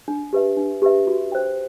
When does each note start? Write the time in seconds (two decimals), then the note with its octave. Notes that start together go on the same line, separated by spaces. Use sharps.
0.08 D4
0.33 G4 B4 E5
0.57 D4
0.82 G4 B4 E5
1.07 F#4
1.32 C5 G5